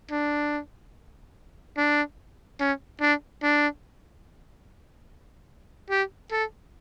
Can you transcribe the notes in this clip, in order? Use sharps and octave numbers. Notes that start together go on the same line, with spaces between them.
D4
D4
C#4
D4
D4
G4
A4